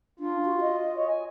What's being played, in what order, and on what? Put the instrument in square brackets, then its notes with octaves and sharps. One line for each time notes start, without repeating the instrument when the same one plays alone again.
[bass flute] D4 [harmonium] F4
[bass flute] F#4
D#5
[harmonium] C#5
G#5